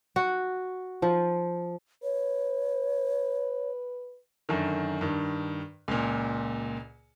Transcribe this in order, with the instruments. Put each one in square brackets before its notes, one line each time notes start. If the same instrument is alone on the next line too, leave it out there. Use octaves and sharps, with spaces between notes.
[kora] F#4
F3
[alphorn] B4 [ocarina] C#5
[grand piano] F#2 D3 D#3
G2 D#3
C#2 A#2